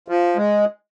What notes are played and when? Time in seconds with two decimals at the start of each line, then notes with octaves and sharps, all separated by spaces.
0.08 F3
0.36 G#3